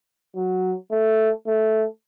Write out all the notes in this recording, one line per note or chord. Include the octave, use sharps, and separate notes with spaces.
F#3
A3
A3